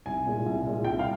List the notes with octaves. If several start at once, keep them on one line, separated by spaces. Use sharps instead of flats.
C2 G#5
A#2 G#3
C2
A#2 G#3
C2 G5
F5